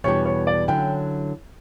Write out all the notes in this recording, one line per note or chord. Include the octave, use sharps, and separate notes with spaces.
E2 B2 G3 D4 G4 C#5
C#5
D5
D3 F#3 C#4 E4 G5